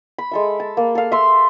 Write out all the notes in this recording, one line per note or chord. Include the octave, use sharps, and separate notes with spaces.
B5
G#3 A4 E5
A5
A#3
A4 F5
E5 C6